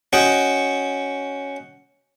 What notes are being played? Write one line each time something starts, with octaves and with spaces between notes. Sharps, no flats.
C#4 F#4 C#5 D#5 G5